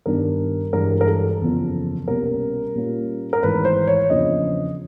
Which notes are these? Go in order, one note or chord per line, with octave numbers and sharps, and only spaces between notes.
G2 D#3 G3 B3 D4 A#4
G2 E3 G#3 A#4
A#4
A4
F#1 E2 C#3 F3
C2 B2 G3 A#3 C#4 A#4
A#2 G3 A#3 C#4 F4
A#4
G#1 G#2 E3 A3 B4
C5
C#5
E2 C#3 F3 A#3 D4 D#5